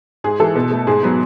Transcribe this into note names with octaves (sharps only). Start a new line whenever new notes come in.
G#2 G#4
E3 G#3 A4
B2
A3
G#2 G#4
F#3 B3